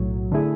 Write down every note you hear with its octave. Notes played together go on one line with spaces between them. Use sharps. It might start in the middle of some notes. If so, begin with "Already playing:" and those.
Already playing: B1 A2 F#3
D3 A3 E4 G#4